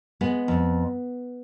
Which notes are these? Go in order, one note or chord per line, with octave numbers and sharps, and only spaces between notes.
G#3 B3
F2